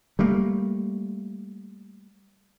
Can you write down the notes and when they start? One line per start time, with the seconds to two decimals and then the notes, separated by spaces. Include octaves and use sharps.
0.19 G3 A3 A#3